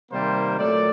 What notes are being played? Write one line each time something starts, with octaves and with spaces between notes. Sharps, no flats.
C3 D#3 G3 A#3 C5
A#2 F#3 A3 D5